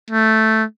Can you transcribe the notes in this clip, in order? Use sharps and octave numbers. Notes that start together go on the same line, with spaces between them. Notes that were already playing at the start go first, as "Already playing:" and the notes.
A3